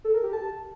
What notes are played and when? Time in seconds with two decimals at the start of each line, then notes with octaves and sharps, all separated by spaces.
0.04 A4
0.14 A#4
0.23 G4
0.33 A5